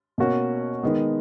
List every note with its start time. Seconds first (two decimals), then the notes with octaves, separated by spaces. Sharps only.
0.18 B2 A#3 C#4 F#4
0.83 D#3 G#3 B3